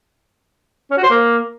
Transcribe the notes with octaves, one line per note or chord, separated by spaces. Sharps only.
C#4
F#4
C5
A#3